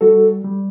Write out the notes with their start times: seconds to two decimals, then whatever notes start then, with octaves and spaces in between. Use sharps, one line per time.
0.01 G3 F#4 A4
0.44 G3